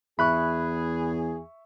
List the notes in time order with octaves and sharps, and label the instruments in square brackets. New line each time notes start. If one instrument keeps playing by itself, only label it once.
[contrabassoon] E2 [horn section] G#4 [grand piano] E5 C#6 [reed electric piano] B5 F#6